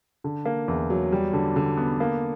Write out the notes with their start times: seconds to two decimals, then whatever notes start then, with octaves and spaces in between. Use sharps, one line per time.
0.24 D3
0.46 A#3
0.68 E2
0.90 F#3
1.12 G3
1.33 D3
1.56 D3
1.77 B3
2.00 A#3